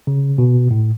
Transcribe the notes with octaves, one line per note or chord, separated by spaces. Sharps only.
C#3
B2
A2